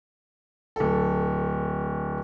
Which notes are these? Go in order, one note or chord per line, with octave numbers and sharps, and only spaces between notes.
D1 A4